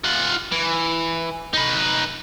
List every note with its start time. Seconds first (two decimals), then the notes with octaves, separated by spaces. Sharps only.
0.04 F4 F#5
0.52 E3
1.54 D#4 B4